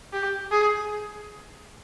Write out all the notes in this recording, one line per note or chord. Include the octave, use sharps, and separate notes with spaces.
G4
G#4